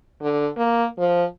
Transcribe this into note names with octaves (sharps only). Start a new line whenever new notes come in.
D3
A#3
F3